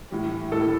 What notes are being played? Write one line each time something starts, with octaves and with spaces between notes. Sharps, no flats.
A2 E3 G3
A2 E3 G3 A4